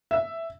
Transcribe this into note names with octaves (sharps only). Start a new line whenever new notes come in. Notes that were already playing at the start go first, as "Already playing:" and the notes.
E5